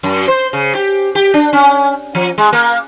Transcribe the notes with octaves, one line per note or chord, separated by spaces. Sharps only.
F#2
C5
C#3
G4
G4
D4
C#4
F3
G#3
A#3